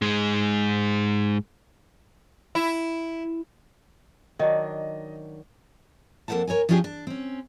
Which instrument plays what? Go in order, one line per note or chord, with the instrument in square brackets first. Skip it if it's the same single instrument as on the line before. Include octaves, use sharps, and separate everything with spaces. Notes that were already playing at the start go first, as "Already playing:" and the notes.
[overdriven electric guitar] G#2 G#3
[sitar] E4
[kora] D#3 F#3 D4 [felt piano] D#5
[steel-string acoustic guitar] F2 A#3 A4 C5 F#5 A5
A#4 C#5 D#5 G#5
F3 C#4 D4 F4 G4 G#4
D4
C4 C#4